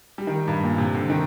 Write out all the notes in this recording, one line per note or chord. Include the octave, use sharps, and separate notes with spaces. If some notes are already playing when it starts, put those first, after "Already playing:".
G3
D#3
G2
A#2
C3
D3
D#3